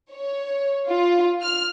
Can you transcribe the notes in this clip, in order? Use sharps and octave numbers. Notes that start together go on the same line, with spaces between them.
C#5
F4
F6